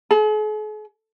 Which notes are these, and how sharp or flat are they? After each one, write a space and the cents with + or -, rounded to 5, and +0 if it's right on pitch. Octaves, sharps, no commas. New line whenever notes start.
G#4 +45